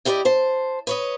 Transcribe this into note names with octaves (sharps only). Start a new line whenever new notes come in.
E4 G4 A4 B4 D5 D#5
C5 A5
B4 C#5 D#5